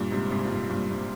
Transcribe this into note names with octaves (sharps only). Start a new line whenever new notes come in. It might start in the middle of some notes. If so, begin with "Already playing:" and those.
Already playing: G2 A#2
G#2 C3
G#2 C3
A#2
G#2
G2 A#2
G2